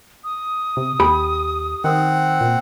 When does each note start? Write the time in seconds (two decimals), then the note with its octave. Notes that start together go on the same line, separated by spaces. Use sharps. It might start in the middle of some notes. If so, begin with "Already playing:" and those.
0.24 D#6
0.77 C3
1.00 D#2 G4 G#5 B5
1.84 D#3 C4 F#5
2.41 A#2